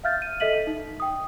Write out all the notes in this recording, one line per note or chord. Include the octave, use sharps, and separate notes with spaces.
E5 F5 F6 G6 A6
D#7
A4 D#5 E5 B6 D#7 F#7
D#4
G5 D#6